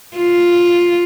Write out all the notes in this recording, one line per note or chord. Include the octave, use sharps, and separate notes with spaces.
F4